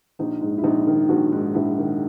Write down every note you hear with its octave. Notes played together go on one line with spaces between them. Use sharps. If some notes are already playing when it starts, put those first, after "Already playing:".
A#1 D#4
G#2
E4
A#1 D#4
D#3
A#1 F#4
G#2
A#1 E4
D#3